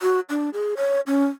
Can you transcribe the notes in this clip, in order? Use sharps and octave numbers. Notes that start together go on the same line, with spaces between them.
F#4
D4
G#4
C#5
C#4